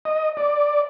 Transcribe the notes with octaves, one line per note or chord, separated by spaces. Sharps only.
D#5
D5